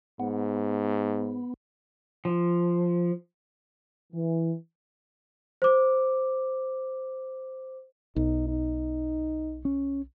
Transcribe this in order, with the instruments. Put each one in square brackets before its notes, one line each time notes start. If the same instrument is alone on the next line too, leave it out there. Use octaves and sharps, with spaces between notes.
[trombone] G#2 [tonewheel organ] B3
[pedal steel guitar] F3
[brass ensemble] E3
[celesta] C5 D6
[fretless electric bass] B1 [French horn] D#4
[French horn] D#4
[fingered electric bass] C#4